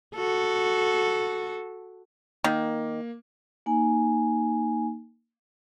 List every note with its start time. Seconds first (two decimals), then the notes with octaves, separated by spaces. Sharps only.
0.15 F#4 A4
2.44 D#3 A#3
3.66 A#3 D#4 G#5